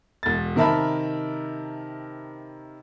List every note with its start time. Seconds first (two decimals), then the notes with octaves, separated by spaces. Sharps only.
0.23 E1 A6
0.56 C3 D#3 A#4 E5 A5 B5